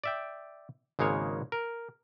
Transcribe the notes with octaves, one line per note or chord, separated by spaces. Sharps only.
D5 E5 G5
G#1 C#3 G#3 A#3 C#5
A#4